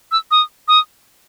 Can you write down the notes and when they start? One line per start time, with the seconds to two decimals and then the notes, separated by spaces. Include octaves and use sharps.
0.12 E6
0.31 D#6
0.68 D#6